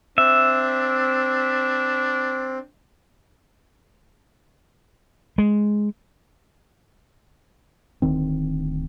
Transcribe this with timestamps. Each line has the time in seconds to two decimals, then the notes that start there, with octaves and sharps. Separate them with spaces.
0.18 C4 D4 E5
5.38 G#3
8.02 D1 D2 D#3 C4